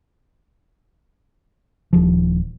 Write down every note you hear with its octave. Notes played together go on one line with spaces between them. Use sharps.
D#1 F3